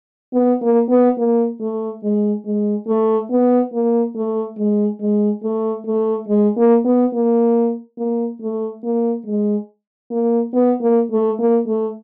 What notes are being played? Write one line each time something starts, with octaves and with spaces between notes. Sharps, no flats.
B3
A#3
B3
A#3
A3
G#3
G#3
A3
B3
A#3
A3
G#3
G#3
A3
A3
G#3
A#3
B3
A#3
A#3
A3
A#3
G#3
A#3
B3
A#3
A3
A#3
A3